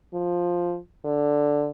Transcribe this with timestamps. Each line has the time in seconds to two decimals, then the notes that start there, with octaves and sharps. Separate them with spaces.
0.13 F3
1.05 D3